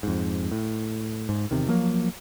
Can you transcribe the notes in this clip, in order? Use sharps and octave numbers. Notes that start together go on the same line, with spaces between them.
F2 G#2
A2
G#2
E2 C3 D#3
F3 F#3 A#3